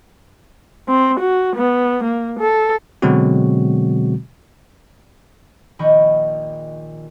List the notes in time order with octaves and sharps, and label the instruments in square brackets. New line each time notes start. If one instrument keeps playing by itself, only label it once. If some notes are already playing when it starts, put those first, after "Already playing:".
[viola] C4
F#4
B3
A#3
A4
[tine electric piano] B2 D3 F#3 G#3 C4 F#4
[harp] A#1 D#3 D#5 G5 B5 C#6